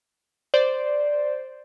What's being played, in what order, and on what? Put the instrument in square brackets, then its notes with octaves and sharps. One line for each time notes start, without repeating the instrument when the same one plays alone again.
[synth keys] C5 D5